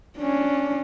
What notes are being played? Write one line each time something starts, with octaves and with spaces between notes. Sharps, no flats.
C#4 D4